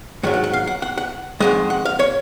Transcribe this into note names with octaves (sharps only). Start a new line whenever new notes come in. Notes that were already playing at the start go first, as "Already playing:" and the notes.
G#2 D#3 F#3 F#5
F#5
F#5
F5
F#5
F#5
F#5
F2 C3 D#3 G#3 F#5
F#5
F5
C#5